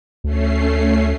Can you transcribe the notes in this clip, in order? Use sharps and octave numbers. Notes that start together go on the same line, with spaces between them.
D2 A3 C#4 C7